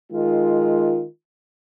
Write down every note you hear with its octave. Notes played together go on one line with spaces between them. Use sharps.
D#3 G#3 F4